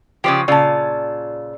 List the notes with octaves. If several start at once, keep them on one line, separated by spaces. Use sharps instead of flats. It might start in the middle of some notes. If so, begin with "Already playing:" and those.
C#3 F3 G4 D5
A#2 C#3 F4 D5 A5 E6